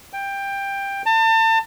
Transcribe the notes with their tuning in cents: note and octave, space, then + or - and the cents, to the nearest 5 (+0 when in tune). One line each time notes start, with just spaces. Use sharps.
G5 +15
A5 +35